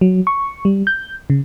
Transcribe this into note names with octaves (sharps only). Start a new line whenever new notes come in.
F#3
C#6
G3
G6
C#3